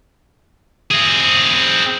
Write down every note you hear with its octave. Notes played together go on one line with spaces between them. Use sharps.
C4 G#4